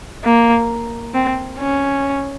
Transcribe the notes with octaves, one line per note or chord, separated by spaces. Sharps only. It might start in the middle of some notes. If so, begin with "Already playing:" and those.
A#3
C4
C#4